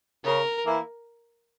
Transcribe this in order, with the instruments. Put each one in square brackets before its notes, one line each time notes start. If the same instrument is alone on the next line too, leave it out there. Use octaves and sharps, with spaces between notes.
[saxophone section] C#3 [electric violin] A#4
[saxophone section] E3 A#3 E4